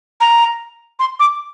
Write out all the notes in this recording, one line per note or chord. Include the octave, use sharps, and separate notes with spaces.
A#5
C6
D6